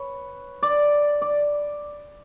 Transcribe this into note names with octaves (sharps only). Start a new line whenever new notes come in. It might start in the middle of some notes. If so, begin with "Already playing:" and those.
Already playing: B4 C#5
D5
D5